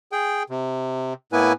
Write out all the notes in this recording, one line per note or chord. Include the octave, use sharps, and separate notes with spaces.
G#4 G5
C3
A2 A#3 B3 E4 B4 G#5